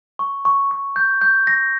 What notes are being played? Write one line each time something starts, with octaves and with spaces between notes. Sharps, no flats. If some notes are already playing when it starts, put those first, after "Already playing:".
C#6
C#6
C#6
G6
G6
A#6